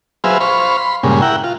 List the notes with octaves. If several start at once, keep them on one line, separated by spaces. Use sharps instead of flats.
F#3 G#4 B4 C5 E5 F5
C5 F5 B5 C#6
B5 C6
G2 A#2 C#3 G#3
E4 A#4 F#5 G5
F4